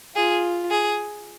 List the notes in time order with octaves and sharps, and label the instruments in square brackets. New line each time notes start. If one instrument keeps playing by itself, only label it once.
[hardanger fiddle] F4 [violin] G#4
[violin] G#4